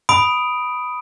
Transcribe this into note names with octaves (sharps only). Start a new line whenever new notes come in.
B5 D#6 D7